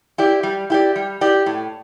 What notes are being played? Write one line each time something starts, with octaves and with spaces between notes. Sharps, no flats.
E4 G4 D5
G3
E4 G4 D5
G3
E4 G4 D5
A2